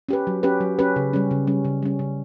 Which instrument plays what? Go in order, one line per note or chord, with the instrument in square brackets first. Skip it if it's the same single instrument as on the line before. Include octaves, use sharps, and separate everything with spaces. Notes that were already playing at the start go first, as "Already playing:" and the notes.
[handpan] C#4 G4 B4
F#3
C#4 G4 B4
F#3
C#4 G4 B4
C#3
G3 C#4
C#3
G3 C#4
C#3
G3 C#4
C#3